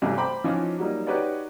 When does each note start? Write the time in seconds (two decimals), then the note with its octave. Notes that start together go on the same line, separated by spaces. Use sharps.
0.02 B1 G2 C3 E3 F#3 A3
0.18 C5 G5 A#5 B5 D6
0.44 E3 F3 C#4 D#4 F4
0.78 F#3 G3 A#3 D#4
1.06 D#4 F#4 G4 B4 C#5 D5